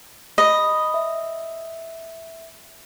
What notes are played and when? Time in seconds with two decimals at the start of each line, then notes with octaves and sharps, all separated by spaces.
0.38 D#5 B5
0.94 E5